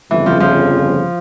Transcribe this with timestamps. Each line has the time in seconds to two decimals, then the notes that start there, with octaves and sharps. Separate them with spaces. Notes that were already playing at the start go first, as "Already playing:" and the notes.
0.11 G1 F2 C#3 E3
0.26 F3
0.40 F3